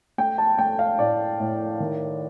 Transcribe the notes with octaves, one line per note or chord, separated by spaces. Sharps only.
A3 G5
A5
A3 G5
F5
A2 D5
A2
D#3